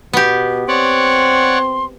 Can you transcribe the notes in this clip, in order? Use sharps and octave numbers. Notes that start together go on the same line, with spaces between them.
B2 B3 G4
C4 C#5 D5 F#5 C6